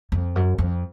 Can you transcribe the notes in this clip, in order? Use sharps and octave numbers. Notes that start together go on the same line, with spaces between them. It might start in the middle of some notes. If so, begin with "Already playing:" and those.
F2
F#2
F2